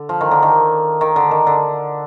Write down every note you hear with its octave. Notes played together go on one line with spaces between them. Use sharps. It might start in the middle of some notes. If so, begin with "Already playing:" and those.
Already playing: D3
F3
D#3
D3
D#3
D#3
D3
D#3
D3